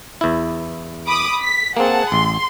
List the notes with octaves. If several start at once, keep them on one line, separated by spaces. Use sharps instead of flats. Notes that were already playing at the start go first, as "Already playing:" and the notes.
E2 E4
B5 D6 D#6
B6
A#3 C4 G#4 F#5 A5
A1 C6